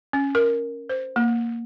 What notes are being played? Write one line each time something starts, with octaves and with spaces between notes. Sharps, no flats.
C#4
A#4
C5
A#3